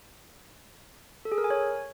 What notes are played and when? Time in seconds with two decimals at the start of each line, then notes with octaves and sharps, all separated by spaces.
1.25 A4
1.32 G#4
1.38 A#4
1.44 G#5
1.50 C#5